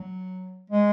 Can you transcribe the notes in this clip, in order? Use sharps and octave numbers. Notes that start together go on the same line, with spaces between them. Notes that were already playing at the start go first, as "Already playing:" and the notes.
Already playing: F#3
G#3